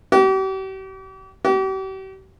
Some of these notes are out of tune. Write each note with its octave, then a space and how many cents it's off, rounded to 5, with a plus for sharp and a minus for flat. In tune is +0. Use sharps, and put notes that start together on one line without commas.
G4 -40
G4 -40